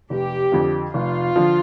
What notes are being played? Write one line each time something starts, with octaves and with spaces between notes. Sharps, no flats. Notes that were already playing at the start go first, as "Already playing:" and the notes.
F1 G4
F2 D3 F3
F1 F4
D3 F3